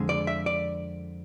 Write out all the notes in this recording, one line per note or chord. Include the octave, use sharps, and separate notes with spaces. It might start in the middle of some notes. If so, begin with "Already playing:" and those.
Already playing: F2 D3 G#3
D5
E5
D5